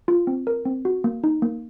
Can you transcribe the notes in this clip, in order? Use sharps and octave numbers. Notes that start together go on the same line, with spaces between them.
F4
C4
A#4
C4
F#4
A#3
D#4
A#3